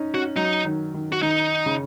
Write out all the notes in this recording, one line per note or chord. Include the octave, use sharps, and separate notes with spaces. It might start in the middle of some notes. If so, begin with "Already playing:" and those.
Already playing: C#4 D#4
C#4 F#4
F#3 D#4
D#3
D#3
F#4
D#3 D#4
C#3